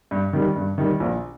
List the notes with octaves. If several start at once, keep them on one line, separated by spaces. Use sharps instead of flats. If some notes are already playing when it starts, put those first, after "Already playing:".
G2
D#3 G3
G2
D#3 G3
A#1